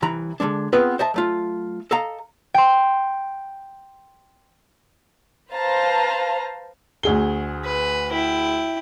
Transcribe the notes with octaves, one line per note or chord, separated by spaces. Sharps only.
C2 E3 A#5 B5
D3 E3 G#3 D4
B3 C4 F4 G#4 B4
C5 D#5 E5 A5
F#3 A3 F4
A4 D#5 F5 A#5
G5 C6
B4 C5 F5 A5 A#5
D2 G#4 G7
B4
E4 G5